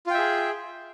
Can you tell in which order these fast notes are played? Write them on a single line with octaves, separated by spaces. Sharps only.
F4 G5 E5 G#4